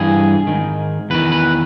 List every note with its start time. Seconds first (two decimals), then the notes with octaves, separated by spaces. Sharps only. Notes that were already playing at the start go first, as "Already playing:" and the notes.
Already playing: G2 E3 G#4
0.47 G#2 D#3
1.10 E2 D#3 B4
1.32 B4